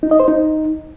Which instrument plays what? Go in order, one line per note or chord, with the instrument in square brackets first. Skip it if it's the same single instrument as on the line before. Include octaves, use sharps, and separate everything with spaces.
[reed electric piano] D#4
D#5
C5
D#4